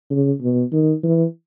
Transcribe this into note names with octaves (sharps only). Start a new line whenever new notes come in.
C#3
B2
D#3
E3